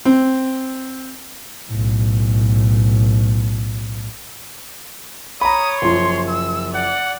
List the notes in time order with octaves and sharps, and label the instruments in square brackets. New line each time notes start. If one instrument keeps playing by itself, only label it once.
[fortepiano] C4
[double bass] B1 A2
[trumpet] C#5 [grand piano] A#5 B5 [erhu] D#6
[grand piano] F#1 F3 [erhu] C6
[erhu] E6
[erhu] D5 [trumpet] F#5